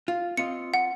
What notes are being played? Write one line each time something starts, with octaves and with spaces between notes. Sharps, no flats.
F4
C4 F4 D#5 C#7
F#5